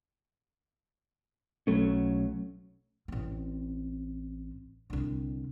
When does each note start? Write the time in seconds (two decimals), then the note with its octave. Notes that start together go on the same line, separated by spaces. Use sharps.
1.67 B1 F#3 A3 C#4
3.08 A1 C4
4.90 C2 D3